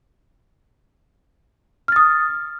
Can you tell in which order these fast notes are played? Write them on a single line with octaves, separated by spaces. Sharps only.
F6 A6 D#6